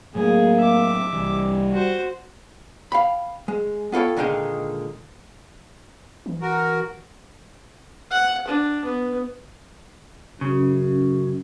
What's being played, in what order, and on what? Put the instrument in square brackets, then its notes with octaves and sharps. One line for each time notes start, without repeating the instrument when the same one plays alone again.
[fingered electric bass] A2 F#3 A3 [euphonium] A#3 [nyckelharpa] G#4
[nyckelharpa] E5 D6
[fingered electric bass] C2 E3 [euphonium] G3
[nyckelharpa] F#4 C5
[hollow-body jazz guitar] F5 G5 B5
G#3
B3 F4 A4 C#5 G5
A#2 D3 D#3 G#3 D#4 G5
[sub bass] E3
[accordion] F#4 A#4
[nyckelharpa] F#5
D4
B3
[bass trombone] F#2 [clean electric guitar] C#3